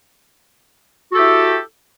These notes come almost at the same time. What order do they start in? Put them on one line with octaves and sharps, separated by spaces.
F#4 A4 G4 E4